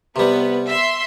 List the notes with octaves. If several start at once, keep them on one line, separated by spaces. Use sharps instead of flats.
C3 G3 B3 B4
E5 C6